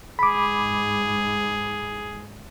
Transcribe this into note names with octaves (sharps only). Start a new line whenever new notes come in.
G#2 G#4 B5 D6